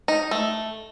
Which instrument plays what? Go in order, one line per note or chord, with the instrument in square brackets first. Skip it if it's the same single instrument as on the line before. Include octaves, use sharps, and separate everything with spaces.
[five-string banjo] D#4
A3